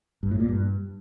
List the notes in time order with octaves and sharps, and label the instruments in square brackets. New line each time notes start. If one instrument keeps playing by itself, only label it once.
[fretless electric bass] G2
A2
A#2
G2